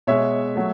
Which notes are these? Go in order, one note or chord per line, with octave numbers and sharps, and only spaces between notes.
B2 G#3 C#5 E5
F#3 A3